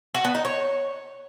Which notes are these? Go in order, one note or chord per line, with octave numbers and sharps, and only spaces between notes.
F#4
B3
D#4
C#5